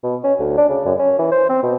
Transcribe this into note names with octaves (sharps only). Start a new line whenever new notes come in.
B2
C#4
D2
D4
C#3
F#2
C#4
E3
C5
C4
B2